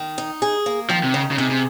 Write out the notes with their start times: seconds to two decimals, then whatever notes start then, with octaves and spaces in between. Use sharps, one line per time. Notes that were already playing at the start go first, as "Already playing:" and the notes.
Already playing: D#3
0.18 D#4
0.42 G#4
0.66 A#3
0.89 D#3 F3
1.03 C3
1.14 C#3 D#4
1.31 C#3
1.38 C3 G#4
1.51 C3